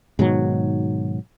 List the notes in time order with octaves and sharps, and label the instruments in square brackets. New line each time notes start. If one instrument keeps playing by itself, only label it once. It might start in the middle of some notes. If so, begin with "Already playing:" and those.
[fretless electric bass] G#2 B2 D#3 F#3